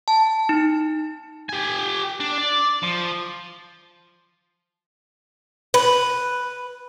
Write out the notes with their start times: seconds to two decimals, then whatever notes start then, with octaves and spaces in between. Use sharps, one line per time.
0.08 A5
0.49 D#4
1.49 G4 G#5
2.20 D4
2.38 D5
2.83 F3
5.74 B4